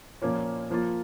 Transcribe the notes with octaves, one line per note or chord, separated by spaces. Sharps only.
A#2 F3 A#3 C#4 F4
F3 A#3 F4